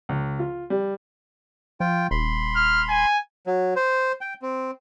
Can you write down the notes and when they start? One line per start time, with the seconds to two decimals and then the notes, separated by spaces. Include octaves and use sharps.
0.09 C#2
0.39 F4
0.70 G3
1.80 F3 F4 G5
2.11 D#1 B5 C6
2.56 F6
2.89 G#5
3.47 F#3
3.76 C5
4.21 G5
4.42 C4